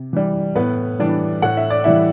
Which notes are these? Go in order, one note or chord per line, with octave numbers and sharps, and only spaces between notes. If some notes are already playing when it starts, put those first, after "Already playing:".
Already playing: C3
E3 G3
A2 B3 B4
E3 G3 D4 D5
A2 F#5
E5
D5
E3 G3 E4 E5